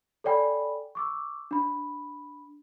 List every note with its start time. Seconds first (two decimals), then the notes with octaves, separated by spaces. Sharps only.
0.24 A4 C#5 D5 G5 G#5 B5
0.95 C#6 D6 E6
1.51 D4 B5